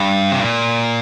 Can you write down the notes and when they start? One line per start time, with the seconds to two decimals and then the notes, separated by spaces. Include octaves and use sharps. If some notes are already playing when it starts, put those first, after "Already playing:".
Already playing: G2
0.32 C3
0.40 A#2